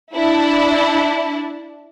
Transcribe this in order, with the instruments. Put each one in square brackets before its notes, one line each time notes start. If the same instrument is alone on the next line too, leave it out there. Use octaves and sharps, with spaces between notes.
[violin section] D4 E4